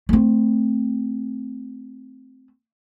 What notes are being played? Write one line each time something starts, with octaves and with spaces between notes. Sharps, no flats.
A3 C4